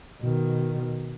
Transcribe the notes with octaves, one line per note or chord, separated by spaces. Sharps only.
B2 D#3